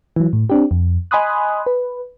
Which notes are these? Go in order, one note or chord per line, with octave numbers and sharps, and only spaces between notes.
E3 F#3
A2
C4 D4 G4
F2
D#5 G#5 B5 C6 D#6 F#6
B4